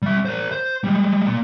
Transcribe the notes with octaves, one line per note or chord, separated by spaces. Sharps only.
G3 E5
A#4 C5
C5
G3 G#3
A#3 D5